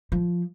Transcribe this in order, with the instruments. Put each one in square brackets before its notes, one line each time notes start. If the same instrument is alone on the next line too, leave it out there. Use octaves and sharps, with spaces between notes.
[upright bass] F3